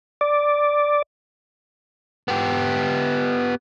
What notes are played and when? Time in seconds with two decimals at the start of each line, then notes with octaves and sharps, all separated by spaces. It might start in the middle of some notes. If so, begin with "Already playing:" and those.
0.21 D5
2.28 B3 G4